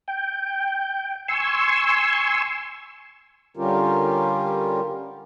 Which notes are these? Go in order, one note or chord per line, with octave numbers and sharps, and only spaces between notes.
G5
G#5 C6 C#6 E6
D3 G3 C#4 F4 G4 A#4